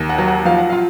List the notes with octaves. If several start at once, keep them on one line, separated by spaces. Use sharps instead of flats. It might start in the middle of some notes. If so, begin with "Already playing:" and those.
Already playing: D#2
F#5
F#3
F#5
F3 F5
F#5
F4 F5